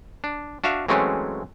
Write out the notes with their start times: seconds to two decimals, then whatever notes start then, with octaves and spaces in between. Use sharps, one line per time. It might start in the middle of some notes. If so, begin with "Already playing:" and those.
0.24 D4
0.64 D4 F#4 E5 F5
0.88 E3 F#3 G#3 A3 C4 C#4